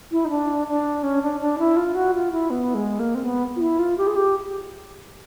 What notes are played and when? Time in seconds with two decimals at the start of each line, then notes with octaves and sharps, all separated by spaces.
0.12 E4
0.25 D#4
0.30 D4
0.68 D4
1.03 C#4
1.22 D4
1.40 D4
1.59 E4
1.77 F4
1.95 F#4
2.14 F4
2.32 E4
2.50 B3
2.75 G#3
2.99 A#3
3.15 C4
3.24 B3
3.56 F4
3.61 E4
3.79 F4
3.98 G4
4.07 G#4
4.16 G4